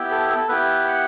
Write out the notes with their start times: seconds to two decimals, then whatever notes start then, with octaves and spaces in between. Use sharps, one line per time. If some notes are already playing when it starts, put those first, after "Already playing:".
Already playing: B3 E4 G4
0.11 A4
0.30 A4
0.49 B3 E4 G4 B4
0.88 F#5